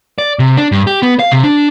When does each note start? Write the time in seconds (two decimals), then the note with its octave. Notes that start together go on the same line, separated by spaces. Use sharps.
0.18 D5
0.39 C3
0.57 D4
0.72 G2
0.87 G4
1.02 B3
1.19 F5
1.31 C3
1.44 D4